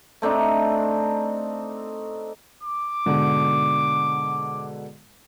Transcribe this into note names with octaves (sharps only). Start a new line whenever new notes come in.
A3 C4 D4 D#4
D6
G#2 B2 D3